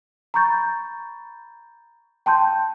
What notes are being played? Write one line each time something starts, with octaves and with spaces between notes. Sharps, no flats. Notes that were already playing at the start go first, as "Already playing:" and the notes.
A#5 B5 C#6 G6 A6
G5 A5 C6 G6